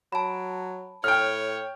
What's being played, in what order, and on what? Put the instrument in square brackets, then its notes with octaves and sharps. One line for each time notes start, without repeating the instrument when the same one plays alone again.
[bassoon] F#3 [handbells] A5 B5
[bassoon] A2 [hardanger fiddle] C#5 [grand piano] G5 F6